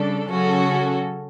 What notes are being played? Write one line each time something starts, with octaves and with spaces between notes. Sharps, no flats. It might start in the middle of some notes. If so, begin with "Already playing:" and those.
Already playing: C#3 G3 D4 A4
C#3 F#3 C#4 F#4 A4